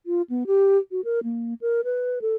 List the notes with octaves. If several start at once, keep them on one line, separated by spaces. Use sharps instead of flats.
F4
B3
G4
F#4
A#4
A#3
A#4
B4
A4